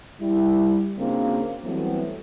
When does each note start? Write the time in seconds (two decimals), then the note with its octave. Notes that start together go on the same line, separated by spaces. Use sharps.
0.21 G3 E4
0.99 C#3 A#3 C4 D4 F4 F#4
1.64 E3 F#3 G3 A3 B3 C4